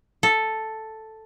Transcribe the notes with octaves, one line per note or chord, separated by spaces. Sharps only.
A4